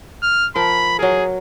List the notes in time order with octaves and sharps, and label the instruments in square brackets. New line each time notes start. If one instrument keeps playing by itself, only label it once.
[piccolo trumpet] F6
[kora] F3 A#4 [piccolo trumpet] B5
[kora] F#3 A#4 [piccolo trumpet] G#4